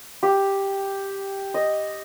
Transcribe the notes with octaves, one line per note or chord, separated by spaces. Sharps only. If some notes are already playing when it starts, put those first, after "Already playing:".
G4
D#5